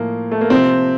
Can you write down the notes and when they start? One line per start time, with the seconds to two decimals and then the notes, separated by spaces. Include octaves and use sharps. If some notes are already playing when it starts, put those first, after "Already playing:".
Already playing: A2 F3 A#3
0.31 A3
0.41 A#3
0.50 C3 F3 C4